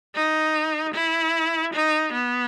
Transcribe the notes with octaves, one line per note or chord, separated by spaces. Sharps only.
D#4
E4
D#4
B3